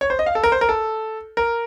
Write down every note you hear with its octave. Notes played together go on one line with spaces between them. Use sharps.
C#5
C5
D#5
F5
A4
A#4
C5
A#4
A4
A#4